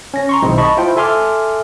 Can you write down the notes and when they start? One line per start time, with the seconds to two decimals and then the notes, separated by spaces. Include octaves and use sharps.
0.14 C#4 A#6
0.29 A#5 C6 C#6
0.43 B1 D#3 G#3 C4 E4
0.58 D#5 A5 B5 C#6
0.77 E4 F4 C5 G5
0.96 A4 E5 G#5 C6 D6 F6